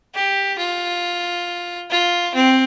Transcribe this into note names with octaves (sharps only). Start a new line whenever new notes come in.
G4
F4
F4
C4